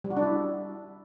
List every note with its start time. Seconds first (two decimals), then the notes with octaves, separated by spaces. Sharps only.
0.04 G3
0.11 F#4
0.17 D4
0.23 E4